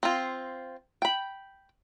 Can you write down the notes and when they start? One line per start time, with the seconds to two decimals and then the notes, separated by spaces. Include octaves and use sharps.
0.03 C4 F4
1.02 G5 B5